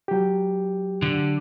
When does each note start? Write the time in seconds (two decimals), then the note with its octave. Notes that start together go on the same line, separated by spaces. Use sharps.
0.08 F#3 G4
1.02 D3